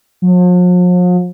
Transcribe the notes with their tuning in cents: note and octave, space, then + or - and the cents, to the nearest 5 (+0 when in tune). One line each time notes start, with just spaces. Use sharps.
F3 +45